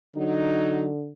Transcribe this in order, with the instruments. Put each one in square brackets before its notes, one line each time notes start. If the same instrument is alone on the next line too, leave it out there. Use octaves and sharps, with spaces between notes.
[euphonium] D3 [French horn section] F#3 D#4